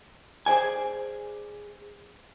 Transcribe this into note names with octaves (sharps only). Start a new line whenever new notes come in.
G#4 C5 D5 G#5